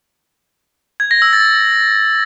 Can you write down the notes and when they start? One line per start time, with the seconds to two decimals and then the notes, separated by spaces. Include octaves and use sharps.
1.00 G#6
1.11 A#6
1.22 E6
1.33 A6